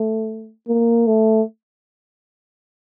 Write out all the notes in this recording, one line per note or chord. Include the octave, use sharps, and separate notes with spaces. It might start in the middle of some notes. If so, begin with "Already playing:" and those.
Already playing: A3
A#3
A3